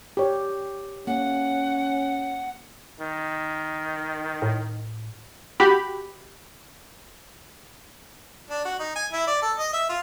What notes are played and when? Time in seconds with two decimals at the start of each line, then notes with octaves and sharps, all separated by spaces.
0.17 G4 C#5
1.07 A#3 C#4 F#5
3.00 D#3
4.42 A2
5.60 F#4 G4 B5
8.50 D4
8.65 F#4
8.79 D#4
8.95 G#5
9.12 E4
9.27 D5
9.42 A4
9.58 D#5
9.73 E5
9.89 F4